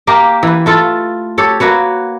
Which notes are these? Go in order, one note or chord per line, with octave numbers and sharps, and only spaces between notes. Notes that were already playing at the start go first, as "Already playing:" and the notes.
A#3 G4 A#4
E3 B4
A3 F4 A4
G4 A4 C#5
A#3 F#4 B4 C#5